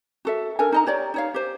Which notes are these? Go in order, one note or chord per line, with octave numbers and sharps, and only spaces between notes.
F#4 A4 E5
D4 A4 A#4 G#5
D#4 D#5 A#5
G4 C#5 D5
D#4 C#5 F5
G4 C5